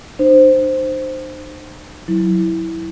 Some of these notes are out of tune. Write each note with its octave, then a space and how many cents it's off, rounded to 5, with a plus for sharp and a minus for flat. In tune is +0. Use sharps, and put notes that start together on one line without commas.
D#4 -40 C5 +0
F#3 +0 E4 -10